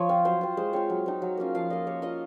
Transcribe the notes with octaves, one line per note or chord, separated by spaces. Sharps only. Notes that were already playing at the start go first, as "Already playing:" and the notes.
Already playing: F3 C#5
C4 F4
F#3 C5
C4 F4
G#3 C5
C4 F4 C#5
F#3
C4 D#4
F#3
A#3 C#4 F4
F3 F5
A#3 F4 D#5
A#3 C#5
F4 D#5